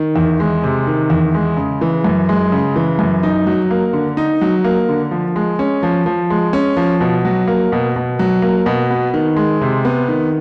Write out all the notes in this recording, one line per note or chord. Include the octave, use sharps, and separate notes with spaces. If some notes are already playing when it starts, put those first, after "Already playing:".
Already playing: D#3
E2
G#3
C3
D#3
E2
G#3
C#3
E3
F#2
G#3
C#3
E3
F#2
D#4
F#3
A#3
D3
D#4
F#3
A#3
D3
F3
G#3
C#4
F3
F3
G#3
C#4
F3
B2
F#3
A#3
B2
B2
F#3
A#3
B2
B3
D#3
G#3
C3
B3
D#3